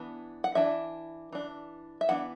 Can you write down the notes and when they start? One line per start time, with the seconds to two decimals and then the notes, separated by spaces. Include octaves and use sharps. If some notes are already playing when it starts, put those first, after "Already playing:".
Already playing: E3 B3 D4
0.44 F#5
0.55 E3 D4 E5
1.32 E3 D4
2.01 E5
2.09 E3 B3 D4 F#5